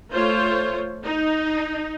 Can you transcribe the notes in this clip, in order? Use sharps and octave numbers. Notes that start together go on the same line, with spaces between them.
A3 F4 C5 C#5
D#4